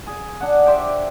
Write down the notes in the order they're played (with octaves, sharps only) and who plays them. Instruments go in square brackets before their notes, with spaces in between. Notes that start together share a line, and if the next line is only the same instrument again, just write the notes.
[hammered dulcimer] G#4
D4 F#5
G4 C5 D5 E5